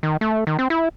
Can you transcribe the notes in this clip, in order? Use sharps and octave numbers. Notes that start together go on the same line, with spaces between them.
D#3
A3
D#3
C4
E4